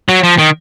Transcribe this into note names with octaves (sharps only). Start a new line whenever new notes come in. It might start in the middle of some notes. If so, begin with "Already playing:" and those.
F#3
F3
D#3